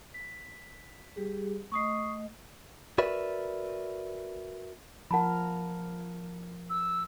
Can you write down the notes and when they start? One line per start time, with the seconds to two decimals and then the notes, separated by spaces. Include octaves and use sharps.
0.14 B6
1.16 G3 G4 G#4
1.72 A3 D#5 C#6 D#6 C7
2.98 F#4 A#4 B4 D5 E5
5.11 F3 A#4 F#5 A5 B5
6.70 E6